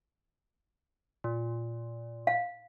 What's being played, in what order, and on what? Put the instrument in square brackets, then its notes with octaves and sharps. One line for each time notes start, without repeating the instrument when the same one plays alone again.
[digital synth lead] A#2
[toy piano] F5